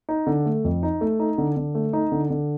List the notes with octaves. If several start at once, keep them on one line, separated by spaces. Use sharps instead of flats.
D#4
D3
A3
F2
D#4
A3
D#4
D3
D3
A3
D#4
D3
D3